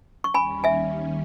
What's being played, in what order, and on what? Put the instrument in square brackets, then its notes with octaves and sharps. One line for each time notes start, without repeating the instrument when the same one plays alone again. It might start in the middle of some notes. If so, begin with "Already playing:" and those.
[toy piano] C#6
[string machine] D#2 D#3 G3 C#4 [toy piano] G#5 B5
[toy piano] E5 G#5